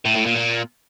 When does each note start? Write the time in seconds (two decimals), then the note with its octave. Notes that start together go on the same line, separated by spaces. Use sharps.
0.06 A2
0.16 A2
0.26 A#2
0.37 A#2